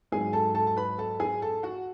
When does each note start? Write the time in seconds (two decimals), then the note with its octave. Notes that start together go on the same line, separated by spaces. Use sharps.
0.12 G#2 F#3 G#4 G#5
0.33 A4 A5
0.55 A4 A5
0.67 A5
0.77 B4 B5
0.99 A4 A5
1.20 G#4 G#5
1.42 A4 A5
1.63 F#4 F#5